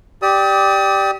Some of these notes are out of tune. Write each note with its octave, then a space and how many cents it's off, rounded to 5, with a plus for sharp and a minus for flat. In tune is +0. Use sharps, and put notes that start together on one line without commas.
G4 +0 D5 +5 D#6 +35